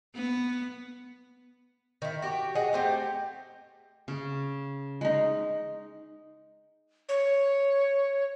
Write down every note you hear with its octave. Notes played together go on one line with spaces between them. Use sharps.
B3
D#3 E4
F#4 G4
G#4 D#5 F#5 G#5
A3 C4 G4
C#3
G#3 D#4
C#5